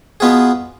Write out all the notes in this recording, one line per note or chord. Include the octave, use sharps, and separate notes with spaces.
B2 B3 F4 G#4